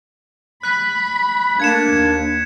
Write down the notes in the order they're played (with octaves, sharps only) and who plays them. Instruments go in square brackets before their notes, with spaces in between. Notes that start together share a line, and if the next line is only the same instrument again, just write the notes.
[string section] B5 [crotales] F#6 B6
[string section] A3 [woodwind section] A#3 D4 [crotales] G#6 C#7 E7
[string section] D#2